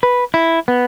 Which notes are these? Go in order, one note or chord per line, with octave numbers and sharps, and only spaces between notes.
B4
E4
B3